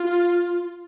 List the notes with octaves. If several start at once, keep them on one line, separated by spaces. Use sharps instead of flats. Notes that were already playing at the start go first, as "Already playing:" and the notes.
Already playing: F4